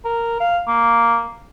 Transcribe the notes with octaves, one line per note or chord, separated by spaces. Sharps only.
A#4
F5
A#3